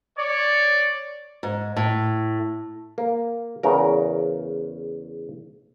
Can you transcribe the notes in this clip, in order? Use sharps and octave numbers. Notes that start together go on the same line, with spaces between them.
C#5 D5
G#2
A2
A#3
E2 C#3 A#4